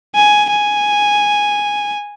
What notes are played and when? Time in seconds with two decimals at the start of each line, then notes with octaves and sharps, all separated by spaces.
0.15 G#5
0.52 G#5